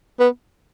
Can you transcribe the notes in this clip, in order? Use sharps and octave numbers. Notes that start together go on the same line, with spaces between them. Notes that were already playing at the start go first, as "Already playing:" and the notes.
B3